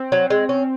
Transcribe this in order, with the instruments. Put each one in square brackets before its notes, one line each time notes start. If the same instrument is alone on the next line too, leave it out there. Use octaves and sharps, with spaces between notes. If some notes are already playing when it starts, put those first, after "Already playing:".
Already playing: [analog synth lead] C4
[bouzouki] F#3
G#3
C#4